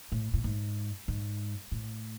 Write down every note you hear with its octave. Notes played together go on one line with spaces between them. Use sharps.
A2
A2
G#2
G#2
A2